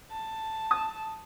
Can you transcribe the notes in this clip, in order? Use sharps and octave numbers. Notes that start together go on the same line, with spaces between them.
A5
D#6